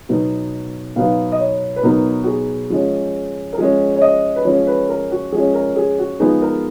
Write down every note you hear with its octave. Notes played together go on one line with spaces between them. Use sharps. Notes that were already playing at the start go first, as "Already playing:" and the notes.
B2 F#3 B3 D#4
B2 F#3 B3 D#4 F5
D#5
C#5
B4
B2 F#3 B3 D#4 A#4
F#4
G#4
F3 G#3 C#4
A#4
F3 G#3 C#4 G#4
C#5
D#5
B4
F3 G#3 C#4 C#5
B4
A#4
F#4
F3 G#3 C#4 G#4
A#4
G#4
F#4
F3 G#3 B3 D#4 G#4
A#4